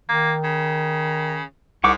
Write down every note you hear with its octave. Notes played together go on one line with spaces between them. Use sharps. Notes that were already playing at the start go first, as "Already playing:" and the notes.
D#3 A#3
C#3
C2 G#2 F#5 C#6 D6